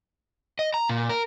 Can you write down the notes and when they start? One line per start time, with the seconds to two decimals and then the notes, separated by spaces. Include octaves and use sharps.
0.59 D#5
0.74 A#5
0.89 A#2
1.09 A#4